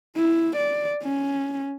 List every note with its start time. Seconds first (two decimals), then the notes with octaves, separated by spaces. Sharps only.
0.17 E4
0.57 D5
1.04 C#4